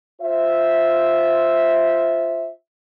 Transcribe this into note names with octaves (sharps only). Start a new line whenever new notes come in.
F4 C5 E5